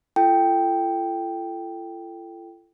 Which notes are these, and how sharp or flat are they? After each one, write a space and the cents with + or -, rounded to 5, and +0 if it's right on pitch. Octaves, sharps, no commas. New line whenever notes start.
F4 -45 A4 +0 G5 +0